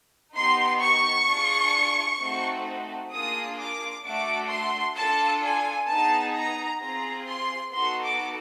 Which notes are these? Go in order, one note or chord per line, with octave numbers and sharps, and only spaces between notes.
B3 D#4 G4 C6
C#6
D4 F4 G#4
A3 C4 D#4 F#4 A4
A#3 D4 F4 G#4 D#6
D6
A3 D4 F#4 A4 D6
C6
D4 F4 A4 A5
G#5
B3 D#4 G#4 A5
A#5
C4 F4 G#4 A#5
C6
B3 D#4 F#4 A4 C6
D6